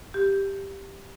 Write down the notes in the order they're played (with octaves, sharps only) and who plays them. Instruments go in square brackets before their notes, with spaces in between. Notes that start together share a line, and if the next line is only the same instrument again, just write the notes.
[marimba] G4